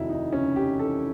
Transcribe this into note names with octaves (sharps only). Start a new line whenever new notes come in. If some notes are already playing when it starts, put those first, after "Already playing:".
Already playing: F1 D#2 E4 F#4
D#4
C#3 C#4
G4
E3 A4